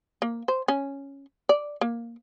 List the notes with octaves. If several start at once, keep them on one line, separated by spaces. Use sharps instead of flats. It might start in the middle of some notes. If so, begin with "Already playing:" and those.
A#3
C5
C#4
D5
A#3